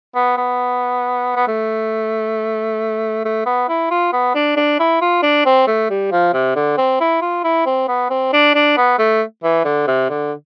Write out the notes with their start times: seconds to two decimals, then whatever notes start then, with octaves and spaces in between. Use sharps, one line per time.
0.15 B3
0.38 B3
1.36 B3
1.48 A3
3.25 A3
3.46 B3
3.69 E4
3.91 F4
4.13 B3
4.35 D4
4.57 D4
4.80 E4
5.01 F4
5.23 D4
5.46 C4
5.67 A3
5.90 G3
6.12 F3
6.34 C3
6.56 D3
6.78 C4
7.00 E4
7.22 F4
7.44 E4
7.66 C4
7.88 B3
8.10 C4
8.33 D4
8.55 D4
8.77 B3
8.99 A3
9.43 E3
9.65 D3
9.87 C3
10.09 D3